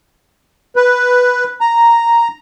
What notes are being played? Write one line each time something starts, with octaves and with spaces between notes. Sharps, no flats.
B4
A#5